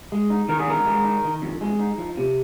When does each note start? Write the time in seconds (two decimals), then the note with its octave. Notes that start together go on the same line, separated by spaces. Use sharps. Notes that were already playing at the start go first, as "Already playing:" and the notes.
0.12 G#3
0.30 D#4
0.49 D#3 A#4
0.59 G#4
0.67 F2 A#4
0.87 G#3
1.05 D#4
1.24 D#3
1.42 F2
1.61 G#3
1.79 D#4
1.98 F3
2.17 C3